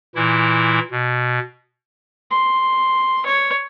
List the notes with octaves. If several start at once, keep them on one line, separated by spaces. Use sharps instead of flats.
A#2 E3 E4
B2
C6
C#5